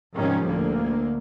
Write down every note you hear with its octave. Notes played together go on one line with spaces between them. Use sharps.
G#2 C3 D#3 F3 G3 C#4
D2 A2 D3 A#3